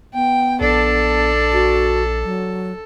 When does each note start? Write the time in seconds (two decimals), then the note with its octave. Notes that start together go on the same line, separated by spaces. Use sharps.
0.14 B3 G5
0.61 A#1 D4 A4
1.53 F#4
2.24 F#3